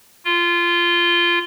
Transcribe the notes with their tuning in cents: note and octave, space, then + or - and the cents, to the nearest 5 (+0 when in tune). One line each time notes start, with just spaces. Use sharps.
F4 -15